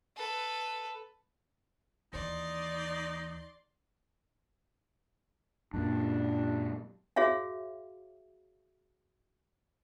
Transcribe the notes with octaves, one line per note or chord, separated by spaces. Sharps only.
A4 B4
D#2 E3 D#4 D5 C6
F#2 A#2 D4
F#4 G#4 C#5 E5 F5